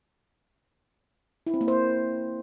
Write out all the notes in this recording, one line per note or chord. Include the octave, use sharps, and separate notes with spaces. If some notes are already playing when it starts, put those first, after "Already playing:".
E4
C4
A#3
C5